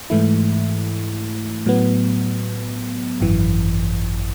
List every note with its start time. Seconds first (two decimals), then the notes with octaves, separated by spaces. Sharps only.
0.10 G#2 E3 A3 E4
1.66 A2 F#3 B3
3.20 G#1 F#2 E3